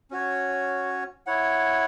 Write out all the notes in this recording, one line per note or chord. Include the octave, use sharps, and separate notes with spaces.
C#4 F#4 C#5
E4 C#5 F#5